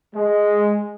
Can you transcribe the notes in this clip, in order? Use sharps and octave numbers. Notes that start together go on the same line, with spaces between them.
G#3